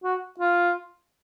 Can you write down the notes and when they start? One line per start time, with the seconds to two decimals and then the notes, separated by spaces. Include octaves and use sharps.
0.04 F#4
0.39 F4